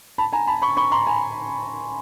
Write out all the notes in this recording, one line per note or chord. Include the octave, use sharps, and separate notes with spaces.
A5 B5
G#5 A#5
A5 B5
B5 C#6
B5 C#6
A#5 C6
G#5 A#5